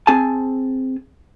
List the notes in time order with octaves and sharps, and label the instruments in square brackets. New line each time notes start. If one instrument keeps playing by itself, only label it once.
[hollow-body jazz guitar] C4 G#4 G#5 A5